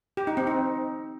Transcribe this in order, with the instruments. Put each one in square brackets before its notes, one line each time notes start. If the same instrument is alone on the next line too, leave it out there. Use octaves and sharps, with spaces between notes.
[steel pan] G4
D#4
C4
D#4